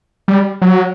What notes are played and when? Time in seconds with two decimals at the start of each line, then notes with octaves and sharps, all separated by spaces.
0.28 G3
0.62 F#3